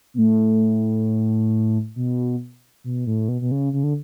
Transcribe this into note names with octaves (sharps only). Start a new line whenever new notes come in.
B2
A2
B2
B2
A2
B2
B2
C#3
C#3
D3